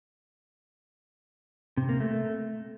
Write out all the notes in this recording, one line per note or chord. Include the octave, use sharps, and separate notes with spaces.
C3
A#3
A3